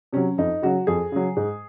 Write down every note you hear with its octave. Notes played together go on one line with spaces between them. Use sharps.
C3 F#3 C#4
F2 D#4
C#3 F#3 F#4
F2 G#4
C#3 F#3
G#2